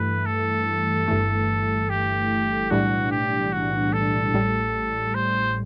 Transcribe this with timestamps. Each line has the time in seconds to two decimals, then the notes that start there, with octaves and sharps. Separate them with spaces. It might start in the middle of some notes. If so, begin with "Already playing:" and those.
Already playing: G2 E3 A3 B4
0.26 A4
1.08 G1 G2 E3 A3
1.89 G4
2.70 B1 A2 E3 G3 D4 F#4
3.11 G4
3.52 F#4
3.93 A4
4.34 A1 A2 G3
5.14 C5